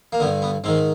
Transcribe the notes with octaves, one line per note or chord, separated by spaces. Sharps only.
A#3
G2 D3 B3
B3
G#2 D#3 C4